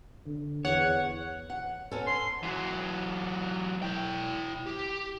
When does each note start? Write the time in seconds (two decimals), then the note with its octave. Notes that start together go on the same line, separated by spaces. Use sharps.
0.26 D3
0.65 E2 C#5 F#5
1.50 F#5
1.91 B3 C#4 A4
2.07 C6
2.43 E3 F#3
3.82 E4 G5
4.67 G4